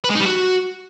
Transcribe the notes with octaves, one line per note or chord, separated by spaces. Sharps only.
B4
G#3
D#4
G3
F#4